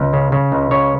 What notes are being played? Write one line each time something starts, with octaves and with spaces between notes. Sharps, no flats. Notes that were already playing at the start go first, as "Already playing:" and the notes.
Already playing: C#2
C#3
C#3
C#2
C#3 C#5